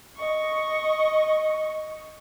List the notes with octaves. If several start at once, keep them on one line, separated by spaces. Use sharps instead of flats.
D#5 C#6